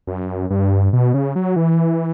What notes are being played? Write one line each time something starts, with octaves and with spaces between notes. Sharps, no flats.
F#2
G2
B2
C#3
F#3
E3